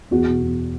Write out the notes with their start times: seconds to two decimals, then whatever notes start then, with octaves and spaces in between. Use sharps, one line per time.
0.11 E2 F#4
0.26 B2
0.41 E2